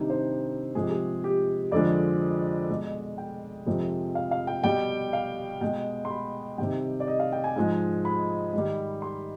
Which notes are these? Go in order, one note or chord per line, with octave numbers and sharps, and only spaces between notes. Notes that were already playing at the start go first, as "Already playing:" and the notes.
Already playing: C3 D#3 G3 D4 D#4
C5
C3 F3 G#3 G#4
G4
G#4
G4
F2 D3 F3 G#3 D5
B2 G#3
G5
F2 C3 F3 G#3
F5
F5
G5
B2 G3 G5
F5
B2 G#3 G5
C6
B5
C3 D#3 G3 G5
D5
D#5
F5
G5
G#5
G#2 F3 G#3
B5
G#2 D#3 G3
C6